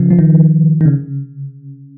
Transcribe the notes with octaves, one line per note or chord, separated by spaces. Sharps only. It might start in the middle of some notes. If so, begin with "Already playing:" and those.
Already playing: C#3 F3
F3
D#3
D#3
C#3